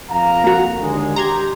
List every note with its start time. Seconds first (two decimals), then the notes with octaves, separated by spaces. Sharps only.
0.11 F2 F5 A#5
0.44 A#3 F#4
0.80 D#2 D3 G#3
1.16 G4 A#5 C6 G#6